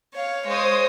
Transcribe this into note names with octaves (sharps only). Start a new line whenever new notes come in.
C#5 F5
G#3 C5 C#5 D#6